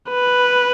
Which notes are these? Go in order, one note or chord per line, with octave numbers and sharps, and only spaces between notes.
B4